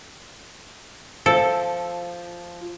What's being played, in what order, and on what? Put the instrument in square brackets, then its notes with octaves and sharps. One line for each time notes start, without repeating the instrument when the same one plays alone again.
[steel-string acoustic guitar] F3 [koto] A4